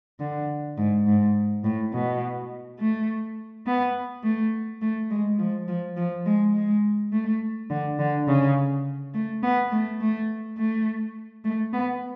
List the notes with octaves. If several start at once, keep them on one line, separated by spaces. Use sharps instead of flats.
D3
G#2
G#2
A2
B2
A3
B3
A3
A3
G#3
F3
F3
F3
G#3
G#3
A3
D3
D3
C#3
A3
B3
A3
A3
A3
A3
B3